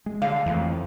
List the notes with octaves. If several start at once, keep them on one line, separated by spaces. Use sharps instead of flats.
G#3
D3 F5
F2 E3 A3